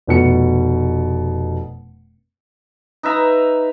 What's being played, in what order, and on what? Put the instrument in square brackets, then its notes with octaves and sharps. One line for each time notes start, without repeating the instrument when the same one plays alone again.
[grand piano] F1 B2 C#7
[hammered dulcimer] D#4 B4 E5 A#5